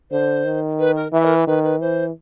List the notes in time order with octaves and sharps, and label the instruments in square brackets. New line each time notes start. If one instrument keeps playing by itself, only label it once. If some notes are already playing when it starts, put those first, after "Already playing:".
[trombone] D3 [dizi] C5
[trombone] D#3
[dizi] B4
A#4
[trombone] E3 [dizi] E5
[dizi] A#4
B4
[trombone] D#3 [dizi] B4
[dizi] B4
[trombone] E3 [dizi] C5